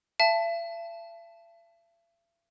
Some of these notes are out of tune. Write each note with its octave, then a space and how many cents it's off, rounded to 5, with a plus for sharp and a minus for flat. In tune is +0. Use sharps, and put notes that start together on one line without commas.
E5 +45 A5 +0